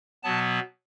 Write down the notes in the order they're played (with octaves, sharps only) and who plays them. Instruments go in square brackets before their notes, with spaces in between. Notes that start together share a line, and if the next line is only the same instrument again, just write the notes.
[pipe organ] B2 F#3 B3 A5